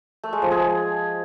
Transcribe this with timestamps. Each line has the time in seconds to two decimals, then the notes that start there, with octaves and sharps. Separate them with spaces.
0.24 A3
0.33 G#3
0.42 F3
0.51 G#4